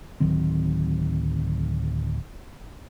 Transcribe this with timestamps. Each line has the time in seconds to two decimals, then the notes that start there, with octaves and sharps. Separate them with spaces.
0.20 D1 D#3 F#3 C4